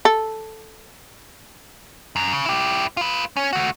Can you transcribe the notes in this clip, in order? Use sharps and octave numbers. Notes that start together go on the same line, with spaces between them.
A4
F#2
C#3
E4 G4
F4 B4
C#4
A3 F#4